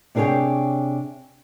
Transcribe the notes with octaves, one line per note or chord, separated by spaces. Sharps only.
C3 D4 G#4 B4 C#5 G5